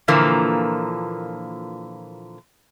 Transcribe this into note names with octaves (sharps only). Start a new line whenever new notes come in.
A#2 D3 E3 F3 A#3